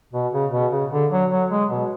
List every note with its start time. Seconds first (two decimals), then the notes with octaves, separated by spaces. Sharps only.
0.13 B2
0.33 C#3
0.52 B2
0.71 C#3
0.92 D3
1.11 F#3
1.31 F#3
1.50 G#3
1.70 B2